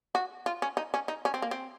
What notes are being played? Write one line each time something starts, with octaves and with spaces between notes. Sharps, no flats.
F#4
F4
C#4
D#4
C#4
D#4
C#4
C4
A#3
C4